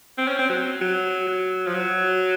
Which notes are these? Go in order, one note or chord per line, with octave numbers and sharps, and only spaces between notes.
C4
C#4
C4
F#3
F#3
F#3
F3
F#3